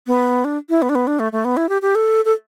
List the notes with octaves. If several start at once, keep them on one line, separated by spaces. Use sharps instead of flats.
B3
D4
E4
B3
D4
B3
D4
A3
A3
B3
E4
G4
G4
A4
A4